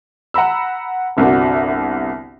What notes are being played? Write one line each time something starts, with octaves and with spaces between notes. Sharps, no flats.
F#5 A#5 B5 E6
G1 C2 C3 D4 F#4